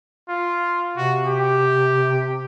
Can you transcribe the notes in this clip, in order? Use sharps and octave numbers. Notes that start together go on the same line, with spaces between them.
F4
C3 F#4
G4